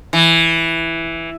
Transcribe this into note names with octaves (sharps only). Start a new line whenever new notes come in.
E3